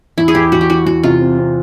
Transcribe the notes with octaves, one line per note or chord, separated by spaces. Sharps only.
E2 E4
G#4
E2 G4
E2 F#4
G4
E3 F#4
E2 F#4
C3 F4
C4
C4